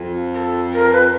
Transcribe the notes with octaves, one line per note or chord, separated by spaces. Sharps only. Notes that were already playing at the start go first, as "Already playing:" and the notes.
Already playing: F2
A#4
A4
A#4
B4